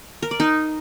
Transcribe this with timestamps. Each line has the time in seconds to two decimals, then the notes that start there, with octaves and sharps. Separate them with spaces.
0.22 A#4
0.31 D5
0.40 D#4